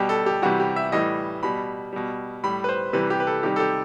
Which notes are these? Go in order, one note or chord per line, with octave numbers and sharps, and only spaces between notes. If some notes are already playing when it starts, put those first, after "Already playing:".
Already playing: B2 G3 G4
A4
G4
C3 E3 G3 F#4
G4
E5
A2 E3 G3 D#5
B2 G3 B5
B2 G3
A2 G3 B5
B4
C5
C3 E3 G3 B4
G4
B4
A4
C3 D#3 G3 G4
A4
G4